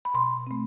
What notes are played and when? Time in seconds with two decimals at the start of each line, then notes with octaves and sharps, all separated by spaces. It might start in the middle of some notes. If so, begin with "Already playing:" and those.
0.05 B5
0.14 B2 C6
0.47 A3 C4